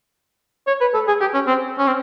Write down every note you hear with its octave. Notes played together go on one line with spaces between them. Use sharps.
C#5
B4
A4
G#4
G4
C#4
C4
C#4
C4